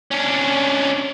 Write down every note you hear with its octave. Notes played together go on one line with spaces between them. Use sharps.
C#4 D4